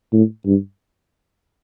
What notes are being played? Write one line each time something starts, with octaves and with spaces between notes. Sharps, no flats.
A2
G2